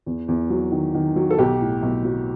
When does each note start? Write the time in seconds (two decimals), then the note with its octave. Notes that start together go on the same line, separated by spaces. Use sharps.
0.06 E2
0.28 E2
0.50 F#3
0.72 D#3
0.95 D#3
1.16 F#3
1.30 A4
1.38 B1 G4
1.61 A2
1.83 B1
2.05 F#3